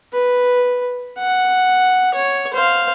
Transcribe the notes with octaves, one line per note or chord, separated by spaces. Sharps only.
B4
F#5
C#5
C5 F5